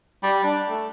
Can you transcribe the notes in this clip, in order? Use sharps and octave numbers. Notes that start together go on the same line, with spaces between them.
G3
D4
A3